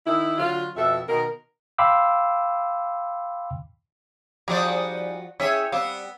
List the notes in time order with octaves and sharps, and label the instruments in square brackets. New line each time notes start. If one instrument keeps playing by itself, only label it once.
[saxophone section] D#3 E4
D3 F#3 F4
F2 B2 A4 E5
B2 D#3 A#4
[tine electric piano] F5 G5 B5 C6 D6 E6
[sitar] F3 F#4 D5 [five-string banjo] G3 [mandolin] D#4 G#4 G5
[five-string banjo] C#4 [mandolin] E4 G5 [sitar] G#4 C#5 E5
[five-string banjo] G3 C4 F5 [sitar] B3 [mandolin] E6